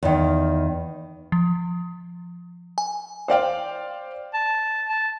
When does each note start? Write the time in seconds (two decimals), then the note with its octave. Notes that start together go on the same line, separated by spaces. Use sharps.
0.03 E2 D#3
1.32 F3
2.78 G#5
3.28 C5 D5 F5 G5
4.34 A5
4.89 A5